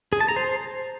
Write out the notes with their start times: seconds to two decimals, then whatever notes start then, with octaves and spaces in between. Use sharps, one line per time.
0.13 G#4
0.20 A5
0.28 A#5
0.36 C5